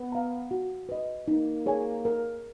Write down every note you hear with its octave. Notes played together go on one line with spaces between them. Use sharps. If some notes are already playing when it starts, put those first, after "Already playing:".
Already playing: B3
F5 A#5
F#4
B4 D#5
A#3 D#4
G#4 C#5 G#5
A#4